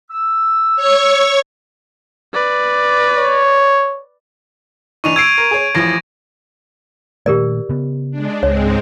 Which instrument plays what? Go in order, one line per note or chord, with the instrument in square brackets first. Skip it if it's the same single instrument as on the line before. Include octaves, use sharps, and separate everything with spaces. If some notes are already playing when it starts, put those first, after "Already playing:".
[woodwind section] E6
[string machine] C#5 C#6
[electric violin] B4 D5
[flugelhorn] C#5
[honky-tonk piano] E3 D4 D#4 [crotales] C#6 D#7 F7
[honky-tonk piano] E6 C7 [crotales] G#6 D7
[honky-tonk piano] A#4
G#4 C#5
[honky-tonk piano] A1 E3 F3 [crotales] G#6 A#6
[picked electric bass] A#2 D#3 A3 [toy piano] G4 A#4 D5
[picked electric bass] C#3 B3
[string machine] G#3 D4
[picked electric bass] C#2 [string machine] G#2 G#3 C4 [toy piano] C#5